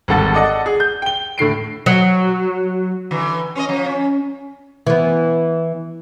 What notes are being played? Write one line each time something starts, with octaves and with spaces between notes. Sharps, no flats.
G#1 G2 D3 A4 F#5 A6
A4 D5 D#5 F#5
G#4
G6
G5 G7
A2 D3 C7 D7
F#3
D3 E3
C#4 C5 D#5
F3
C#4
E3 B3